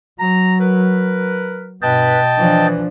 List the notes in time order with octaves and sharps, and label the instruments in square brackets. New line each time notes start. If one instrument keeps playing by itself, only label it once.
[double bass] F#3 [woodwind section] A#5
[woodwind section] A#4 B4
[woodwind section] G2 B4 [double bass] B2 [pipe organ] D#5 G5 A5
[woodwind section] E3 [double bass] F3 D4